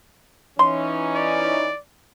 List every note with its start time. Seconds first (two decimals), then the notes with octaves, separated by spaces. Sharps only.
0.59 E3 C#4 D#4 C6
1.15 D5